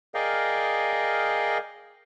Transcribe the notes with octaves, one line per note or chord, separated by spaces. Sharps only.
G#4 A#4 D5 D#5 F5 G5